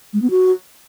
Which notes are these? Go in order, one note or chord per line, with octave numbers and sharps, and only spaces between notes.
G#3
B3
F#4